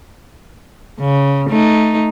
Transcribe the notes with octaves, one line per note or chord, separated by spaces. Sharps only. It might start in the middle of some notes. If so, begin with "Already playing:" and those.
C#3
A3 D#4